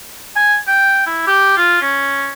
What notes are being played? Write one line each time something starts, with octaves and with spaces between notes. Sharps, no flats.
G#5
G5
E4
G4
F4
C#4